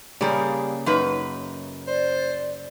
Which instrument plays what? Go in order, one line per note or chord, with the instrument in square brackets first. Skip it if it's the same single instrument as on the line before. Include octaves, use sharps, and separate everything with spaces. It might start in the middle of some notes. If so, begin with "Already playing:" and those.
[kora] C#3 A#3 G#4 [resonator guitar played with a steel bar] G3 D5
[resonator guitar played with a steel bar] F#2 D#4 B4
[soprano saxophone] C5 [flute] D5